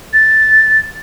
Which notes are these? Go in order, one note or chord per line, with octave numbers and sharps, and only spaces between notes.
A6